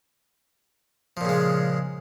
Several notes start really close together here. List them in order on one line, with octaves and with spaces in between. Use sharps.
F3 A#2 C#3 G#3